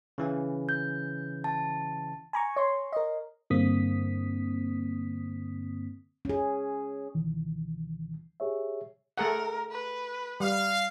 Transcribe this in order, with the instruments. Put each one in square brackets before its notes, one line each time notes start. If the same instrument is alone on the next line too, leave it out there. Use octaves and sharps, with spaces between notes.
[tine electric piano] C#3 E3 C#4
[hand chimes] G6
A5
[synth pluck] G#5 A#5 C#6
C#5 C6
A#4 D#5
[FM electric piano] G2 D3 A#3 C4 D#6 B6
[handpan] C#4 G#4
[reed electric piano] C#2 B2 D#3 E3
G4 G#4 C#5 E5
[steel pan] A3 G#4 F#5 [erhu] A#4
[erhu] B4
[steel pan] G3 [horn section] F5